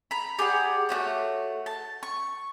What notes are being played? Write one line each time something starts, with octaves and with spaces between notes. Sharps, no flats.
A#5 B5
G4 G#4 D5 F#5
A3 C#4 F#4 C#5
A5
C#6